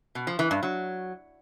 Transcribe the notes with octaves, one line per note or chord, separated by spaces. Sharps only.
B2
F3
E3
G2
F#3